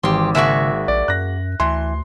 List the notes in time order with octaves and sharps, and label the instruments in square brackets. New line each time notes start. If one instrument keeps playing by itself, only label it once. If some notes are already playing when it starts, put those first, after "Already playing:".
[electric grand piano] G#1 [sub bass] E3 [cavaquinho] G4 C6
[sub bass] C#3 [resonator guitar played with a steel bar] G#3 A#3 F#4 [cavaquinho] E5 C#6
[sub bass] A#1 [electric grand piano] D5
[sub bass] F#2 [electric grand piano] F#6 A#6
[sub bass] D2 [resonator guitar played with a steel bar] E3 [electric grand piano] C6